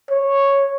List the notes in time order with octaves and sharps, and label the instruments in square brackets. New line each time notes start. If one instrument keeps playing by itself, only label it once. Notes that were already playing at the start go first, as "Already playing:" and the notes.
[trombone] C#5